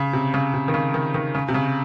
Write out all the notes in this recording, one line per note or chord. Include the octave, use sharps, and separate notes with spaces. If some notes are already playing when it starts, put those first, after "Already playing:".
Already playing: C#3
C3
C#3
C3
D#3
C#3
D#3
D#3
C#3
C3
C#3